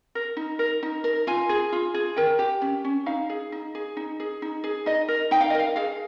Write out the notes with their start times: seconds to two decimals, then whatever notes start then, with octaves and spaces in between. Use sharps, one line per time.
0.15 A#4
0.37 D#4
0.59 A#4
0.83 D#4
1.04 A#4
1.27 F4 G#5
1.49 G#4
1.72 F4
1.94 G#4
2.16 A#4 G5
2.39 G4
2.62 C#4
2.84 C#4
3.06 D#4 F5
3.29 G#4
3.52 D#4
3.75 G#4
3.97 D#4
4.20 G#4
4.42 D#4
4.64 G#4
4.86 D#4 D#5
5.08 A#4
5.31 D#4 G5
5.41 F5
5.50 D#5
5.54 A#4 F5
5.76 G#4 F5